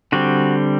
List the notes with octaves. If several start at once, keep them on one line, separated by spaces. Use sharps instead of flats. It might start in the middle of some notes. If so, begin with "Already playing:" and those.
D3 G3 C4 F#4